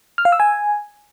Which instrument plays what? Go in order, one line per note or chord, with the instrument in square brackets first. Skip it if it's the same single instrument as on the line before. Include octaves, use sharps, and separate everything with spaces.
[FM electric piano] F6
F5
E6
G#5